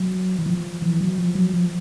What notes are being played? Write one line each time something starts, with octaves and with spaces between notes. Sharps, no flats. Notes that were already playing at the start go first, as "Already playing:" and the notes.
Already playing: F#3
E3
F3
E3
F#3
F3
F#3
F3